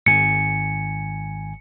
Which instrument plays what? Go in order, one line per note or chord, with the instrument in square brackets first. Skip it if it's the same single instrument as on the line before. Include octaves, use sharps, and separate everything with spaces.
[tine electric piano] G#1 G#5 [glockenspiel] C#7